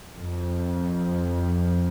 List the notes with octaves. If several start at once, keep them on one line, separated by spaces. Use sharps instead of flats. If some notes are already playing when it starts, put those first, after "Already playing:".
F2